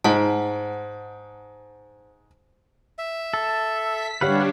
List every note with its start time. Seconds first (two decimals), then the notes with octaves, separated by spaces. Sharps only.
0.04 G#2 C5 F#5 A5
2.98 E5
3.34 A4
3.89 B6
4.21 D3 G3 D4 G4 B4 C#5 F5 F#5